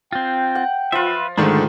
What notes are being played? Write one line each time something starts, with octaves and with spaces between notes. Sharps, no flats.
C4 F4 G5
F#5
F3 F4 B4 E5
G#2 D3 D#3 A3 D4